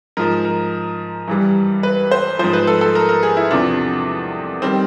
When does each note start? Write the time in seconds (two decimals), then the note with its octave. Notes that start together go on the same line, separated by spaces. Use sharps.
0.17 G#2 F3 A#4
0.45 A#4
1.28 G2 E3 G3
1.83 B4
2.11 C5
2.39 G#2 F3 C5
2.53 B4
2.67 A4
2.81 A4
2.95 A#4
3.09 A#4
3.23 G#4
3.37 E4
3.51 E2 C3 F3 D4
4.62 D#3 G3 C4